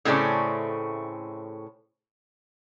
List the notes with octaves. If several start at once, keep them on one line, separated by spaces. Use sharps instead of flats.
A2 C#3 A3 C4 C#4 D5